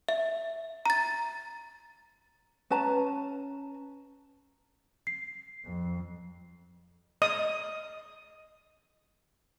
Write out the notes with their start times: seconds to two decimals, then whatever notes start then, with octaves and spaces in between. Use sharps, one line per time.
0.08 E5
0.86 A#5 A6
2.70 C#4 B4 A5 A#5
5.07 C7
5.65 F2
7.22 D#5 D#6